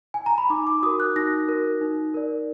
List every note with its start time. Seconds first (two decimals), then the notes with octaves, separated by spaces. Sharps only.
0.14 G#5
0.26 A#5
0.38 B5
0.50 D#4 D6
0.67 D6
0.83 F#4 A#4 D#6
1.00 F#6
1.16 D#4 A#6
1.49 F#4 A#4
1.81 D#4
2.14 A#4 D5